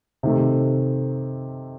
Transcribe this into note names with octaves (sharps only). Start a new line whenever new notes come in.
C3 D#3 A3